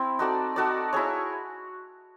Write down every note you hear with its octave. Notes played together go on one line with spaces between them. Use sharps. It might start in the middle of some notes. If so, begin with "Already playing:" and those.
Already playing: C4 E4
D#4 F#4 A4 D5
D#4 F#4 A4 D5
E4 G#4 C#5